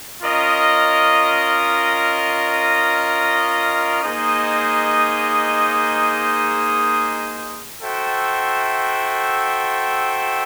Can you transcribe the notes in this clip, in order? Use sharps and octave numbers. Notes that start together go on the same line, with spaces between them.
C#4 F4 A#4 D#5
A#3 D#4 G#4 C5 D#5
F#4 A4 C5 E5 G5